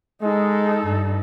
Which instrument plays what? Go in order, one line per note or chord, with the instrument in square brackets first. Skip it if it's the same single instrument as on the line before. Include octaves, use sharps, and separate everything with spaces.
[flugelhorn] G#3 [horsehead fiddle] D#4 A4
[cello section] G2